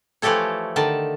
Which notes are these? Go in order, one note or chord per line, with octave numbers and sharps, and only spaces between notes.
E3 F3 A3 G4 A4 C#5
D3 D#3 A5